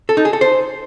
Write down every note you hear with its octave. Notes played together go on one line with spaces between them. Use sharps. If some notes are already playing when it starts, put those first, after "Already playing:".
A4
D#4
G#4
A4
C5